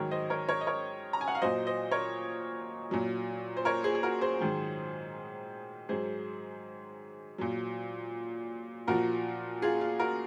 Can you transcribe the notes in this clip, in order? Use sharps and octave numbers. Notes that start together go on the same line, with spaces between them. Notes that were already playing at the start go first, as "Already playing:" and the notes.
Already playing: G#2 D#3 F#3 A#4 C#5
C5 D#5
A#4 C#5
A#4 C#5
D#5
A#4 C#5
A#5
G#5
F#5
F5
A#2 F#3 C5 D#5
C5 D#5
A#4 C#5
A#2 F#3
C5
A#4 C#5
G#4 C5
G#4
F#4 A#4
G#4 C5
G#2 D#3 F#3
G#2 F#3 G#4 C5
A#2 F#3
A#2 F3 F#4 A#4
F4 G#4
F4
F#4 A#4